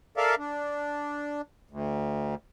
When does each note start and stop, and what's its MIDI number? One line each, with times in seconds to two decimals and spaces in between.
0.17 0.35 69
0.17 0.35 70
0.17 0.35 74
0.17 0.35 76
0.17 0.35 77
0.38 1.41 62
1.71 2.35 38